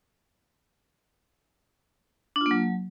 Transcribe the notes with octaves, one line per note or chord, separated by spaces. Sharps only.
D4
F4
A#3
F#3